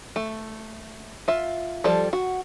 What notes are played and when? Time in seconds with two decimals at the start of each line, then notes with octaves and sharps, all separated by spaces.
0.16 A3
1.28 F4 E5
1.84 F3 G3 A4 D5
2.13 F#4